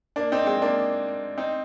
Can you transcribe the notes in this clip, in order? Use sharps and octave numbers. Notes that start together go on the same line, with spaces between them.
A#3 D4
C4 D#4
G#3 C4
A#3 D4
C4 D#4